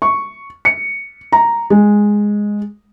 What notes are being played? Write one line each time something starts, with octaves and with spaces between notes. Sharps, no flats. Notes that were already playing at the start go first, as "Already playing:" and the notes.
C#6
C#7
A#5
G#3